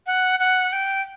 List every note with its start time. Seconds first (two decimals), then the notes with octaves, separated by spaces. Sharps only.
0.07 F#5
0.40 F#5
0.73 G5